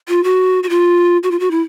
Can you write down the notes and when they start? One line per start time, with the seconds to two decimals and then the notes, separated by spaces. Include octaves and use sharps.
0.09 F4
0.24 F#4
0.63 F#4
0.69 F4
1.23 F#4
1.31 F4
1.40 F#4
1.51 E4